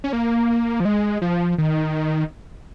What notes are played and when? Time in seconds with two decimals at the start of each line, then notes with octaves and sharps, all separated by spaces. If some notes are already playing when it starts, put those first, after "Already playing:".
0.04 C#4
0.13 A#3
0.80 F3
0.85 G#3
1.22 F3
1.58 D#3